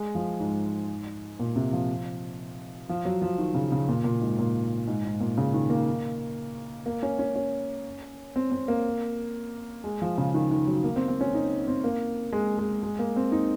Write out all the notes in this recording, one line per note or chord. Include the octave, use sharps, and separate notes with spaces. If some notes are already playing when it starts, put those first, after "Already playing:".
Already playing: G#3
F3
G#2
A#2
C3
F3
F3
F#3
F3
D#3
C#3
C#3
A#2
A#2
G#2
A#2
G#2
G#2
A#2
C#3
D#3
A#3
A#3
C#4
C#4
C#4
C4
C4
A#3
G#3
F3
C#3
D#3
D#3
F#3
A#3
C4
C4
C#4
D#4
C4
A#3
G#3
G#3
G#3
A#3
C4
D#4